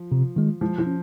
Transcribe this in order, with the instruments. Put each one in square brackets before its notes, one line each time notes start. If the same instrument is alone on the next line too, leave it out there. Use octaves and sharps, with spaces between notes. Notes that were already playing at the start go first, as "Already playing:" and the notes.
Already playing: [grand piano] F3
[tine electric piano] C3
D#3 G#3
[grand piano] F3 [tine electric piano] G#3
[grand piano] F3
[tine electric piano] C#4